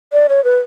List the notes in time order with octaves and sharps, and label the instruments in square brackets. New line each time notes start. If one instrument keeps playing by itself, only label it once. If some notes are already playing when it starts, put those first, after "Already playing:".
[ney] D5
C#5
B4